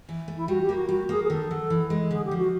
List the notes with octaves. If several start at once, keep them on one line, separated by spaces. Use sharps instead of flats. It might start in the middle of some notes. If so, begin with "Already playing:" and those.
E3
A3
E4
G3 F#4
G4
A#3
F#4
G3 F#4
A#3 G#4
G#4
D#3 A4
F#3
E3
G#3
D3 G#4
G4
F3
F#4